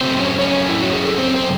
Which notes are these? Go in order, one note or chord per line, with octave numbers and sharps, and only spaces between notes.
F#2 C#3 F#3 A3 C4 C5
C#4 C#5
C#4 C#5
E4
F#4
G#4
A4
C4 C5
C5